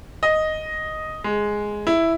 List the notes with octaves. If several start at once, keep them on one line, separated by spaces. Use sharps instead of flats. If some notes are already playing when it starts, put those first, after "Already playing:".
D#5
G#3
E4